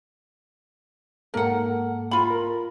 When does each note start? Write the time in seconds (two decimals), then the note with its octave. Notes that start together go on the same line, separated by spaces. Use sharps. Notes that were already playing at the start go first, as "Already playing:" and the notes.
1.34 G#2 A#3 A4 A#4 F#5
2.11 F4 B5
2.30 A#4